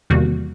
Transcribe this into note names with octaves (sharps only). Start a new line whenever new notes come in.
E2 C3 D#3 G3 A#3 F#4